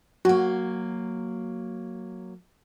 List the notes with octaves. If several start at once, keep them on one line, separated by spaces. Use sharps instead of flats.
F#3 A#3 F#4